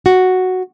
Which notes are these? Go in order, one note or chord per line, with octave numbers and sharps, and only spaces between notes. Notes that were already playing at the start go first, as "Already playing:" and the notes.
F#4